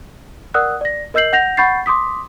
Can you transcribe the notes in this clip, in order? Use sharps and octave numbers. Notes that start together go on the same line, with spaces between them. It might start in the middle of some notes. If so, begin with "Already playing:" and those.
A#4 D5 F#5 D#6 E6 F#6
D5 A#6
A#4 D#5 E6 G6 C7 F#7
F#5 G6 A#6 F7
F#5 B5 C#6 G6 A6 C7
C6 D6 D#6 B6